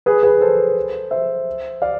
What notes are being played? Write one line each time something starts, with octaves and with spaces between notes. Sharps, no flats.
G#4 B4
G#4 B4
A4 C5
C5 E5
D5 F5